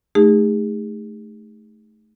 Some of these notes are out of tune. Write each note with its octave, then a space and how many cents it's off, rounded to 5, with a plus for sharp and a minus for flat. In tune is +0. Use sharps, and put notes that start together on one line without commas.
A3 -20 D#4 +0 G#4 -40